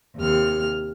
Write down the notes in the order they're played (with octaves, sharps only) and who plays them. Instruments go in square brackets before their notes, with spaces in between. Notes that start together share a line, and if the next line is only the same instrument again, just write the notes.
[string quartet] D#2 C3 F6